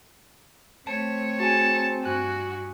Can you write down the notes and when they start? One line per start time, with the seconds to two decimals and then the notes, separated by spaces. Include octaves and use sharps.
0.87 A3 C4 C#5 A5
1.40 F#4 G#4 G#5 A5
2.04 G2 F#4 G#5 F#6